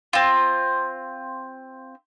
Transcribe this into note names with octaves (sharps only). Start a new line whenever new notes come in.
C4 F4